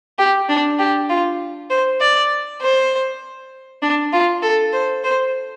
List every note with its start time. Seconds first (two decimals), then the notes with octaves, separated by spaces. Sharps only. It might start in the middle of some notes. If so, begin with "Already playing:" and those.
0.19 G4
0.49 D4
0.79 G4
1.09 F4
1.70 C5
2.00 D5
2.61 C5
3.82 D4
4.13 F4
4.42 A4
4.73 C5
5.04 C5